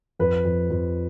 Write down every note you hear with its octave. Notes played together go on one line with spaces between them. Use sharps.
F2 B4
F2
F2